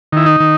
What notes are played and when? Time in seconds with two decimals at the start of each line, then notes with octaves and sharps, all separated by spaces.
0.12 D#3 E4
0.26 D#4
0.40 D#3